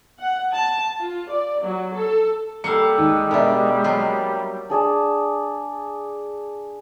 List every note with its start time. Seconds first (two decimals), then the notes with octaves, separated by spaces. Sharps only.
0.18 F#5
0.53 A5
0.99 F4
1.31 D5
1.63 F#3
1.95 A4
2.64 G3 A#3 A4 F5 F#5 E6 C#7
2.98 D#2 G#3
3.31 B2 D4 A#4 E5
3.84 F#3 A#3 F4
4.70 D4 G#4 D5 A5